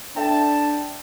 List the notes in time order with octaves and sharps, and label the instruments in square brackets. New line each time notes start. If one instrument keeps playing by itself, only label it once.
[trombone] D4 [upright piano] A4 E5 G5 [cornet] A5